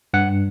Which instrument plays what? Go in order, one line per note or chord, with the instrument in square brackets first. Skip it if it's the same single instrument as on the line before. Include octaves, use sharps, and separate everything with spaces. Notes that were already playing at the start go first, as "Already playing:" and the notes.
[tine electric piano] G2 F#5